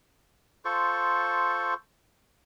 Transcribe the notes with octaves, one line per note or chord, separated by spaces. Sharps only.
F4 A4 C5 C#6